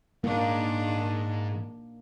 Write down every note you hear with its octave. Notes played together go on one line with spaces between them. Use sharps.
G#2 D#3 A#3 D4 D#4